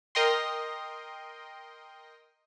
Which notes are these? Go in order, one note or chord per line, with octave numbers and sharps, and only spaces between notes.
A#4 D#5 G5 C6